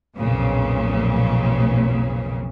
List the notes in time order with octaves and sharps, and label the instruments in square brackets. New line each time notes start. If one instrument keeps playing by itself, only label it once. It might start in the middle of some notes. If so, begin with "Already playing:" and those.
[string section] B1 F2 A#2 C#3